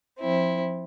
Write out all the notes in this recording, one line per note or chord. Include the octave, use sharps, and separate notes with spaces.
F3 C4 E4